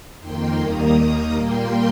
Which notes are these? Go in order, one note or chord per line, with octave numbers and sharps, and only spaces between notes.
F2 D#3 A#3 G5 C6
D#2 D#3 G3 A#3 A#5 D#6
D#2 D#3 A#3 A#5 D#6
A#2 G3 A#3 G5 C6